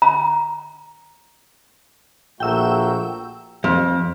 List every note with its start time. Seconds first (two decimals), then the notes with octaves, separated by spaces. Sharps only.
0.02 A#5
2.40 A#1 A3 A#3 F#4 G5 E6
3.64 F2